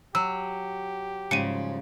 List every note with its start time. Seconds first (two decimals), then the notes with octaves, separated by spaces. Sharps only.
0.15 F#3 G4 E6
1.31 G#2 C#3 F3 G3 C#7 D#7